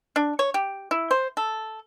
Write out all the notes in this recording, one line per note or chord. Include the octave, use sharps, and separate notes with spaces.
D4
C#5
G4
E4
C5
A4